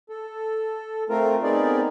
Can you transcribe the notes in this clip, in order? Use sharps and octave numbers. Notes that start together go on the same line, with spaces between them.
A4
A3 C4 F4 A#4
B3 C4 D#4 G#4 A#4 D5